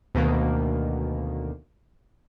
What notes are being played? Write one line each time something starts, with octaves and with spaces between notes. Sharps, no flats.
D2 B2 D#3 A#3